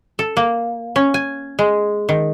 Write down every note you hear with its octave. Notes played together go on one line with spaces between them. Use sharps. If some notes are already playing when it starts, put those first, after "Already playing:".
A4
A#3
C#4
G#5
G#3
D#3